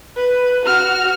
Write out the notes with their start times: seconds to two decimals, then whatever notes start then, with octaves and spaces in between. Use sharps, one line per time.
0.17 B4
0.65 F#4 F6